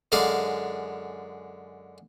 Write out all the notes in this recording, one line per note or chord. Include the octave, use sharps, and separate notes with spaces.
F#2 D3 G#3 F5 G#5 D6